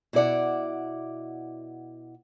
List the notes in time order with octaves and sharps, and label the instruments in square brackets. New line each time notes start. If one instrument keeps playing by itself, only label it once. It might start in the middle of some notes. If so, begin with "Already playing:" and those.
[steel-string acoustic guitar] B2 E4 D5 F#5